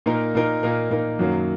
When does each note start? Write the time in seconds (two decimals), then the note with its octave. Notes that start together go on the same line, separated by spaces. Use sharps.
0.06 A#2 A#3 D#4 A#4
0.35 A#2 A#3 D#4 A#4
0.63 A#2 A#3 D#4 A#4
0.90 A#2 A#3 D#4 A#4
1.19 F#2 D#3 F#3 A#3